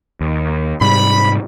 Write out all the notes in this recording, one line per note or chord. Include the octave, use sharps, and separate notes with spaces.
D#2
G#2 C3 G3 B5